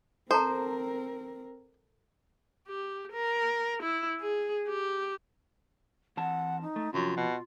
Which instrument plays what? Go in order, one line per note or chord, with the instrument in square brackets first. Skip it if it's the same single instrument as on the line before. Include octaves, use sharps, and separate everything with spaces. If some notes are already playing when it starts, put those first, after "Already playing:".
[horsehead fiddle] C4 A#4 [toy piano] A4 A5 A#5 [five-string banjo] C5
[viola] G4
A#4
E4
G#4
G4
[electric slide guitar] E3 C4 A5 [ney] F#5
[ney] D#4
[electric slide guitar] A3
[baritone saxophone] F#2 [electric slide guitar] C3 F3 [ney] F4
[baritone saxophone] B2